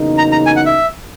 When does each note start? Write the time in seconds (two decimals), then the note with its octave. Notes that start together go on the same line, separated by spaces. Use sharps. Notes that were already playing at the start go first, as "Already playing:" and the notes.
Already playing: E2 C#3 F#3 A#3 D#4
0.18 A#5
0.32 A#5
0.46 G#5
0.56 F#5
0.66 E5